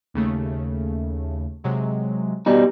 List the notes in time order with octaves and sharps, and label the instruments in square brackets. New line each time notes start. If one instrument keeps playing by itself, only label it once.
[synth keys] D#2 C#3 A3
C3 F#3 G#3
[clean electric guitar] B2 G3 D#4